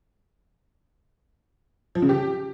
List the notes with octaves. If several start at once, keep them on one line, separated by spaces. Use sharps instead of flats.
F3
C#3
G4